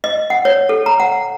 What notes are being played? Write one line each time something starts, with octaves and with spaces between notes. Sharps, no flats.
D#5
F#5
C#5
A4
A#5
F#5